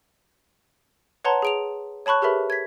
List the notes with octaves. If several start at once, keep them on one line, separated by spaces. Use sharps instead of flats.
B4 C#5 F#5 A5 A#5 C6
G#4 D7 F7
C#5 A5 B5 C#6 F#6
G4 G#4 A#4 B4 E5 B5
G#6 B6